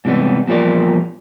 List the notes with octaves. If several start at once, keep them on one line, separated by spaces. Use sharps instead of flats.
G#2 C3 E3 G3 B3
E2 A#2 F3 G3 A#4 D5